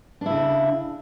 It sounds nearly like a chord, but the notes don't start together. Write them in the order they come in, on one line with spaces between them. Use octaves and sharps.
D4 E4 C#3